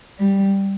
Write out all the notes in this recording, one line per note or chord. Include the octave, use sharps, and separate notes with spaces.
G3